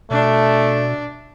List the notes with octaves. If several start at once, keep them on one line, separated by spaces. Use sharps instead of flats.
B2 A3 D4